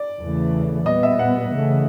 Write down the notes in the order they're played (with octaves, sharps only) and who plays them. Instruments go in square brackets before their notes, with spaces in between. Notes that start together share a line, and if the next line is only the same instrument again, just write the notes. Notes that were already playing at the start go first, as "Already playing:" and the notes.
Already playing: [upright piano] D5
[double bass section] E2 C#3 E3 A3
[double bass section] A#2 G3 B3 [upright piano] D#5
[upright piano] E5
F#5
[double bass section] C#3 E3 A3